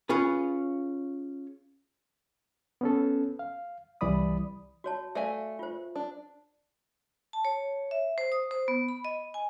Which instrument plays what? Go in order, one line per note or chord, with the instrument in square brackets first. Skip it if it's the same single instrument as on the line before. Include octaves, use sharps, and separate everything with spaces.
[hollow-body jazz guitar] C#4 F4 G#4 B4
[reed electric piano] B3 C#4 A4
F5
C2 E3 G3 D5 B5 D#6
[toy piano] F#4 C#5 A5
[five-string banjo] A3 D5 G#5 [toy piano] E5 F5
[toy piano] F4 C5
[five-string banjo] D4
[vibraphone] A5
C#5
E5
C5
D#6
C5
B3
B5
D#5
G#5